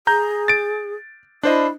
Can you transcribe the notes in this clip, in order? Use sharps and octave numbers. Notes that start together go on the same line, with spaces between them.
G#4 A#5 G6
A6 D7
D4 E4 C5 D#5